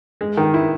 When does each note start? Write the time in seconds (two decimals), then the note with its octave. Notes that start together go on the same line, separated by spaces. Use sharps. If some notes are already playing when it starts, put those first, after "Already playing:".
0.21 G#3
0.37 D#3
0.54 E4